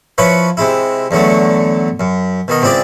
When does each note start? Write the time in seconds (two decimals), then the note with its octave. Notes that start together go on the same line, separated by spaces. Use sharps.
0.18 F3 E4 B4 C#5
0.57 C3 G#3 E4
1.11 E2 D3 F#3 A3
2.00 F#2
2.48 B2 D#3 D#5
2.62 C#2 C4 E4 G#4 D5